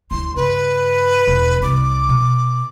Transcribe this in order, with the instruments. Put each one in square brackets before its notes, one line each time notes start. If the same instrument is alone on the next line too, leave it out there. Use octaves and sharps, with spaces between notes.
[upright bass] D2 E4 [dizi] C6
[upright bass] G2 C#3 [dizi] B4
[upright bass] E1
[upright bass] C2 [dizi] D6
[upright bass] B2